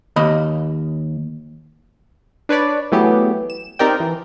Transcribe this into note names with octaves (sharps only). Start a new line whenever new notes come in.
D#2 D#5 B5
D4 B4 C#5 D5
E3 F#3 A3 B3 G4 G#4
E7
C4 D#4 G4 A#4 D5 G5
E3